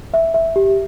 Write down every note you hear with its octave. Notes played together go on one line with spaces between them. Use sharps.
E5
E5
G4